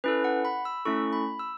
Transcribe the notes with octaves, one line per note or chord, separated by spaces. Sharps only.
C#4 E4 A4 B4
F#5
B5
E6
A3 C#4 E4 A4 C#6
B5
E6